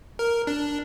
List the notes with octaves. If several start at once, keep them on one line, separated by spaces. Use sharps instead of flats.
A#4
D4